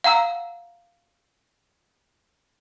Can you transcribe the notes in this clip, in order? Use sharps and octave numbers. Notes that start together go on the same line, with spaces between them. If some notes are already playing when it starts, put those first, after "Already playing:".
F5 F#5 A#5 E6